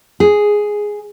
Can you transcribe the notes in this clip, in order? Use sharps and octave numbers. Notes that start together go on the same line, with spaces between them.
G#4